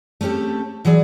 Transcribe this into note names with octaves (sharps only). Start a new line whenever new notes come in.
A3 C4 C#4 G4 A4
E3 F#3 G#4 D5